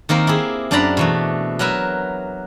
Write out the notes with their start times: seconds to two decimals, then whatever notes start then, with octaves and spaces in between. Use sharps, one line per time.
0.09 D#3 A#3 C4 A#4
0.27 E4 G4 G#4
0.71 F#2 D4 C5 D5 A#5 B5
0.97 B2 E3 A3
1.59 F#3 A#4 B4 E5